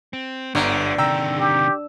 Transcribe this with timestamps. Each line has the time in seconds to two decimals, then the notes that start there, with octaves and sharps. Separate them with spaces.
0.13 C4
0.55 G1 D3 B3 G4 A#5
0.98 C3 D#3 G5 A#5 E6
1.38 G4